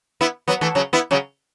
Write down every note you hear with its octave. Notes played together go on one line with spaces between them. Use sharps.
B3 E4
F#3 B3
E3 A3
C#3 F#3
B3 E4
C#3 F#3